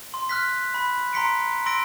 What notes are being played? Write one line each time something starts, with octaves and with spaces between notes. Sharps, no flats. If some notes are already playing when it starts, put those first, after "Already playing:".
C6
F6 F#6 B6
B5
A#5 C6 B6 C#7 D7
C6 E6 A#6 D7